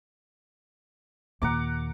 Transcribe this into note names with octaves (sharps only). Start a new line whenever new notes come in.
D#2 A#2 F#5 A#5 D6